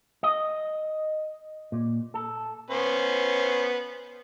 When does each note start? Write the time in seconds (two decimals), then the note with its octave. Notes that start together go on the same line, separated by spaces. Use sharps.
0.23 D#5
1.72 A#2
2.14 A4
2.71 B3 C#4 C5